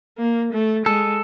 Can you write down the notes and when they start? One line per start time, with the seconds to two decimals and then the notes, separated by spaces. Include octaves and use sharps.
0.18 A#3
0.53 A3
0.86 G#3 A4